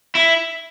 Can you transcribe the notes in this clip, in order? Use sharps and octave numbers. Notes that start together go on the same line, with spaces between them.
E4